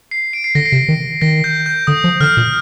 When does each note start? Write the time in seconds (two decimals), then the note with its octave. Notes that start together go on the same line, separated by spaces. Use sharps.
0.11 C7
0.33 D7
0.44 C7
0.55 D3 A#6
0.65 C7
0.72 C3
0.88 D#3
1.21 D#3 A#6
1.44 G6
1.66 G6
1.87 D3 D#6
2.04 F3
2.20 D3 F6
2.37 A#2